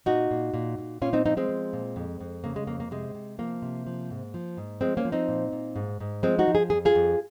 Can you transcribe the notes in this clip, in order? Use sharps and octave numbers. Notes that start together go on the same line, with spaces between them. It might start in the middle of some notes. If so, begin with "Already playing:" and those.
A#2 D#4 F#4
A#2
A#2
A#2
A#2 C#4 F4
C4 D#4
F3 C4 D#4
G#3 C4
F3
A#2
F2
F2
C#3 A#3
G#3
F2 A#3
A#3
C3 G#3
C3
F3 A#3
C3
F3
G#2
F3
G#2
F3 G#3 C4
A#3 C#4
F3
C4 D#4
A#2
A#2
G#2
G#2
F3 G#3 C4
D#4 F#4
F3
G#4
F2 G#4
F4 G#4
F2